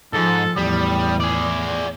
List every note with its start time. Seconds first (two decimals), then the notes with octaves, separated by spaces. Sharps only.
0.13 G#2 F3 A4
0.57 E2 A2 G3 D#6
1.20 G#4 D5